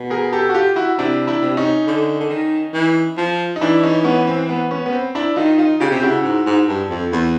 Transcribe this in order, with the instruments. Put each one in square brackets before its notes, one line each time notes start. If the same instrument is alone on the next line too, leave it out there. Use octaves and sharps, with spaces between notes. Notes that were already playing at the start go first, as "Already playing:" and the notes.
Already playing: [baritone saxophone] B2
[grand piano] G#4 A#4
G4 A4
F#4
F4 G4
E4 F#4
[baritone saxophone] C3 [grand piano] D4 E4
[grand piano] D4 E4
[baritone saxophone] C3
[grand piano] C#4 D#4
[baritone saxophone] D3
D3
D#3
E3
F3
[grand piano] D#4
[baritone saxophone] E3 [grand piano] D4 E4
[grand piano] C#4 D#4
B3 C#4
C4
B3
B3 C#4
B3
C4
D4 E4
[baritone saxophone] D#3 [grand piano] D#4 F4
[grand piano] D#4 F4
[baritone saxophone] C#3 [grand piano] F4 G4
[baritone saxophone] C3 [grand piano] G4
[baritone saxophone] C#3 [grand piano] E4 F#4
[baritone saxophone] G#2
G#2
G2
F2
E2